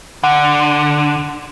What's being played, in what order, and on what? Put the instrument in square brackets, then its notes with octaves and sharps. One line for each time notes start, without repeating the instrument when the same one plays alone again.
[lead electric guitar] D3 [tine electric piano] F#5